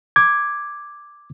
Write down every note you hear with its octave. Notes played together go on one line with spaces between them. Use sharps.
D6 G#6